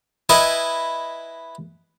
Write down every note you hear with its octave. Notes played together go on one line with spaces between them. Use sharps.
E4 B4 D#5 G#5